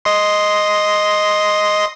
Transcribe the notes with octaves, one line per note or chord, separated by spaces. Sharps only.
D#5 C6